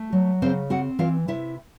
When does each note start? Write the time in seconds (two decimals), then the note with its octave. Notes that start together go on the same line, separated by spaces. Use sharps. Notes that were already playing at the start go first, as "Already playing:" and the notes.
Already playing: A3
0.12 F#3
0.42 C#3 C4 C5
0.70 C4 F#4 F#5
0.99 E3 F4 F5
1.28 C3 E4 E5